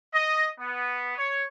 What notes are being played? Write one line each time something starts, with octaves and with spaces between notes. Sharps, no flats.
D#5
B3
C#5